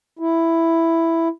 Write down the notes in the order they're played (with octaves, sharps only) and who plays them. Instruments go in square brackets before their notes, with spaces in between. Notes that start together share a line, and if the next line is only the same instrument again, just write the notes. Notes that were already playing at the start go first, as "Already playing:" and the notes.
[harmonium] E4